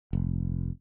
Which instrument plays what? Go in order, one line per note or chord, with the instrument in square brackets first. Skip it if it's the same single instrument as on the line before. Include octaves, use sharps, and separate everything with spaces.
[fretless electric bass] F1